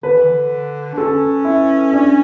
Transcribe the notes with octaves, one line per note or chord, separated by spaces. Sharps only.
D3 B4
E3
D3
D4
C#4 A4
E4
D4